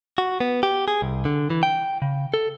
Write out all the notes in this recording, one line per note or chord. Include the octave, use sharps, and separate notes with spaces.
F#4
B3
G4
G#4
C2
D3
E3
G5
C#3
A4